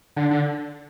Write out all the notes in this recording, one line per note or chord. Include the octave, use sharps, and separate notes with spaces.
D3
D3